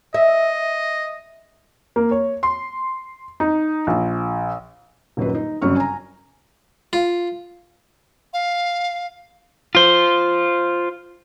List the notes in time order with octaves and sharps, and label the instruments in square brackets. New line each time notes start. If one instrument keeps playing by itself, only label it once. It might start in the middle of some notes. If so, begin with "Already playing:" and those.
[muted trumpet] D#5 [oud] E5
[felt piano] A#3
C#5
C6
D#4
A#1
D#1 F#2 D#3 B4
D#4
G1 F#2 C#3 F#3 C#6 F6
G#5 A#5
[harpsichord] F4
[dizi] F5
[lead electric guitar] F4 C5